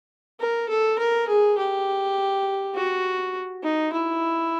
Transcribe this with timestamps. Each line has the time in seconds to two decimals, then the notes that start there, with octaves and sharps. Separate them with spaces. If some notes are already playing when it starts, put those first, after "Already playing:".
0.40 A#4
0.69 A4
0.99 A#4
1.28 G#4
1.58 G4
2.75 F#4
3.63 D#4
3.93 E4